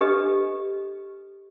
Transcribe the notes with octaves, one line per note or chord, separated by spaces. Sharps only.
D4 G4 A4 B4 D#5